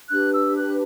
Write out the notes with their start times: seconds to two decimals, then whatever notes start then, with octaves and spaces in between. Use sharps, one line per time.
0.10 D4 G4 B4 F#6
0.34 E6
0.56 F#6